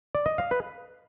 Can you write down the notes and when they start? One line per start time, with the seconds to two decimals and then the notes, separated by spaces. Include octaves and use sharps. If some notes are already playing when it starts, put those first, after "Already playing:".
0.15 D5
0.26 D#5
0.38 F5
0.51 B4